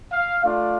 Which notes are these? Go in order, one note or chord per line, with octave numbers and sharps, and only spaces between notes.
F5
A3 D4 F4